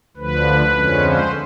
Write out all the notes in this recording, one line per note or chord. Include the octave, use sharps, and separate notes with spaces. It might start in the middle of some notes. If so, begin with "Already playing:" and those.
D2 D3 F3 B4
F2 D3 F3 G#3 C#4
C5